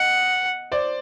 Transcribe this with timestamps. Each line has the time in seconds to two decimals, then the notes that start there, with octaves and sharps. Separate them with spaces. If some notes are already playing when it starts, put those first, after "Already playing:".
Already playing: D#5 F#5
0.72 C5 D5